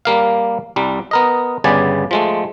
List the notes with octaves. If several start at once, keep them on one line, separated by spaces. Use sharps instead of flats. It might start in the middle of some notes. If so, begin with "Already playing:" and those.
G3 A#3 F5
C2 G3
B3 A#4 D#5
G1 C#3 G3 B3 D5 G#5
F3 G#3 A3